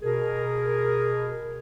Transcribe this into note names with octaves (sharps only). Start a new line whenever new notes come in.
B2 G#4 A#4